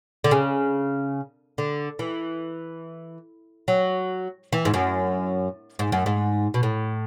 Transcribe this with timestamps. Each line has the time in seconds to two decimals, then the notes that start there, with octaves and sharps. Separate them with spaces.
0.24 D3
0.31 C#3
1.58 D3
1.99 E3
3.68 F#3
4.52 E3
4.65 G#2
4.74 F#2
5.79 G#2
5.92 F#2
6.06 G#2
6.54 B2
6.63 A2